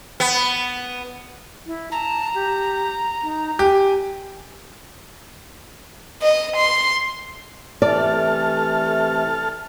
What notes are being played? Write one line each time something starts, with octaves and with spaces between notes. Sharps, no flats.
B3
E4
A5 A#5
G4
D#4
G4 G#5
D#5
C6
C3 E3 A3 A4 D5 A5 F6